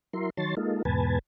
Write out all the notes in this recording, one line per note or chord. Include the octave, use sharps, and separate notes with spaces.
F#3 E4 A#4 C6
D#3 F#3 C#5 A5 C6 A6
G#3 A#3 D#4 F4 A4
E2 G#2 B2 B4 G#5 A5